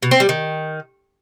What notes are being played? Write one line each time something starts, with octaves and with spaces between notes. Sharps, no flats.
B2
C4
G3
D#3